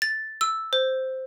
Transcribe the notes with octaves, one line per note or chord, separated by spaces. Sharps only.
A6
E6
C5